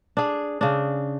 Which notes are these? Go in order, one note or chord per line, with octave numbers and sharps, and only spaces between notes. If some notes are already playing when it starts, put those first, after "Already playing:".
D4 G#4
C#3 D4